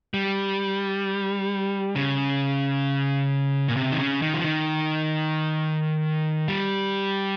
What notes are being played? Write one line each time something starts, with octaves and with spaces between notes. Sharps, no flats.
G3
C#3
A#2
C3
D#3
C#3
D#3
F3
D#3
G3